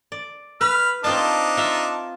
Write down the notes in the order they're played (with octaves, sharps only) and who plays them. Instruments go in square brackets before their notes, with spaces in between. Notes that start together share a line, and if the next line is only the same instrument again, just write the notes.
[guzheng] D5
[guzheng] B4 [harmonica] B5 F6
[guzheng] C4 F4 A5 [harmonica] D4 D#4
[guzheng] F4 E5 A#5